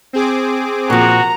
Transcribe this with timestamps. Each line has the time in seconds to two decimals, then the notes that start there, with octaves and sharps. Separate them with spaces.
0.13 C4 G#4 D6
0.90 A#2 F3 F#4 A#5